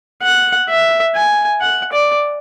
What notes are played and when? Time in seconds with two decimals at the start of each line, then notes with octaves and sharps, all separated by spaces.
0.23 F#5
0.69 E5
1.15 G#5
1.61 F#5
1.92 D5